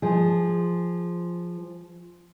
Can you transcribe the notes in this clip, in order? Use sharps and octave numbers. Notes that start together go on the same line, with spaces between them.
F3 G#4